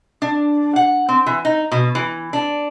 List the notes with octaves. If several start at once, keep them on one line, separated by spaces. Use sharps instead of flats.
D4
F#5
C4
E3
D#4
B2
E3
D4